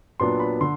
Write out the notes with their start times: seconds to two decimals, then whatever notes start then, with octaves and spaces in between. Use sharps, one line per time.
0.20 A#2 F#3 B3 D4 C6
0.40 B5
0.61 D3 C6